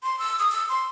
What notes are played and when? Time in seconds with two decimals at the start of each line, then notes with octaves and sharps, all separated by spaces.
0.03 C6
0.19 E6
0.39 D#6
0.52 E6
0.69 C6